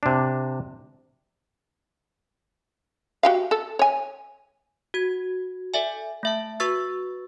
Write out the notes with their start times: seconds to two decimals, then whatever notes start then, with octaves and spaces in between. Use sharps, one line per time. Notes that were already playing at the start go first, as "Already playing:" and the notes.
0.03 C3 D4
3.23 F#4 G4 F5
3.51 A4
3.79 C#5 G#5
4.94 F#4 G#6
5.74 A4 D5 E5 G#5
6.23 A3 E5 A5
6.60 F#4 B4 C#6 E6 A6